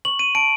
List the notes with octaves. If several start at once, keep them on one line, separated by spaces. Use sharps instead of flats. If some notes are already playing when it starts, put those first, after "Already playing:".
C#6 F#7
D#7
A5 D7